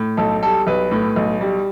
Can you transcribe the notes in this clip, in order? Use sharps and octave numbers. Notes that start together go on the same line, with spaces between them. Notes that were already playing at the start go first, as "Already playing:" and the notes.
Already playing: A2
B1 A4
G3 A4
B1 B4
A2
B1
G3